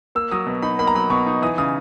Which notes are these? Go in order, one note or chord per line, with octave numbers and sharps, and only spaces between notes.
A#3 E6
F#3 D#6
B2
D#4 B5
A#3 B5
A#5
F#3 B5
B2 C#6
D#4
E3 D#6
C#3 D#6